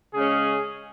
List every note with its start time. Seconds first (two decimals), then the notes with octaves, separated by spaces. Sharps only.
0.14 C#3 G#3 C#4 G#4